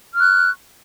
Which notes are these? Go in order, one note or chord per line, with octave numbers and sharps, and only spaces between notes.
C#6 F6 F#6